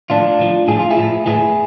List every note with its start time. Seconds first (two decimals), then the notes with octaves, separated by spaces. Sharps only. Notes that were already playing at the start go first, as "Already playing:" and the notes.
0.10 A2 F3 D4 F4
0.39 A2 F3
0.68 A2 F3 G#4
0.79 F4
0.91 E4 G#4
0.97 A2 F3
1.26 A2 E3 E4 G#4